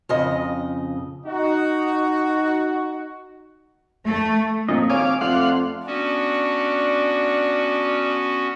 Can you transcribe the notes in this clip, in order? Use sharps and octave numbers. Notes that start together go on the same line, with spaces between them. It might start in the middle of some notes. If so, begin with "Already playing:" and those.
F2 C#3 D#5
D#4 F#4
A3
F2 A#2 D#5
G#1 C#5 F5 G#5 D6
F2 A3 F4 D5 F5 F#5 C6
B3 C#4 D4 F#4